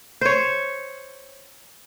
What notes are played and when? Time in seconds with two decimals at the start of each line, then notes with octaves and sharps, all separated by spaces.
0.21 C5 C#5